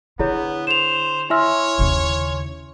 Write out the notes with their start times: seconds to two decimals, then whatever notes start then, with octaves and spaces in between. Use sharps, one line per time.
0.19 D3 B3 E4 G#4 C#5
0.67 C5 E7 F7
1.30 E4 C#5 E5 G#5 C6 E6 F6
1.79 D#2 C#3